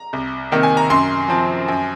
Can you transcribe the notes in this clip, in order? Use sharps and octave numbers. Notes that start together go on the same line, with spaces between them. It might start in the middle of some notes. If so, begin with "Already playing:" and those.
Already playing: A#5
C2
C3 D#3 A#3
G#5
A#5
F#2 C6
F3 C4
F#2